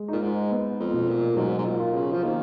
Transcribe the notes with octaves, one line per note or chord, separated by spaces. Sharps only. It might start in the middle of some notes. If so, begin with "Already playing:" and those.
Already playing: G#3
A#2 D#4
G#2
B3
F2
B2
A#2
G#2 F#3
G#2
A#2
F4
C#3
F3
D#3 A#3